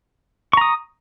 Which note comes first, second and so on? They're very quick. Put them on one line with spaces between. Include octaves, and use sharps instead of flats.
C#6 A#5 D#6